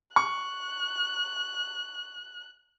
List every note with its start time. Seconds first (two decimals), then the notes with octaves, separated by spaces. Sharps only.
0.16 C#6 F#6